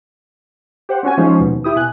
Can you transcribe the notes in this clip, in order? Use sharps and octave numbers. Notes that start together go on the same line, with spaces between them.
G4 C5 F#5
C4 C#4 F#4 G#5
F3 G#3 C#4 D#4 C5
D#2 B2
E4 G4 D#6
B2 G#5 F#6